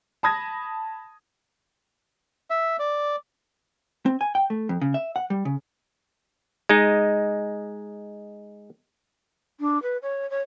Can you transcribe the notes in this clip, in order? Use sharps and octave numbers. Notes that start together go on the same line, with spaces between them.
A5 B5 D#6 G#6 A#6
E5
D5
C4
G#5
G5
A3
F2
C#3
E5
F#5
G3
C#3
G#3 D#4
D4
B4
C#5
C#5